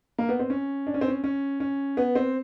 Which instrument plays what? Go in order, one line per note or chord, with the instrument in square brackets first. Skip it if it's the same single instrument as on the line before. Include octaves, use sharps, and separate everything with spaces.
[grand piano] A#3
B3
C4
C#4
D4
C#4
C4
C#4
C#4
C#4
B3
C4